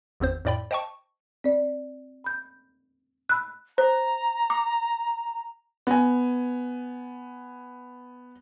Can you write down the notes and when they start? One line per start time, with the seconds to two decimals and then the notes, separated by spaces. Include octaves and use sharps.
0.20 G#1 E2 C4 C5
0.45 F2 A2 D5 G5 B5
0.71 C5 D#5 G5 A5 C#6
1.44 C4 D5
2.24 B5 G6
3.29 B5 E6 F#6
3.78 C5 A#5
4.50 D6
5.87 B3 G#5